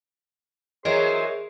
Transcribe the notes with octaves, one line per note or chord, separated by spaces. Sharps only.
E3 F#3 G#4 A#4 C5 C#5 D#5